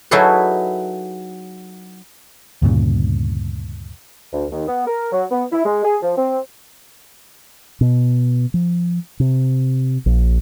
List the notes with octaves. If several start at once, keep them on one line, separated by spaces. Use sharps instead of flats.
F#3 D#4 E4 G#4 A4 B4
D2 G2 A#2 C#3
D2
D#2
B3
A#4
F#3
B3
E4
G#3
G#4
F3
C4
B2
F3
C3
A#1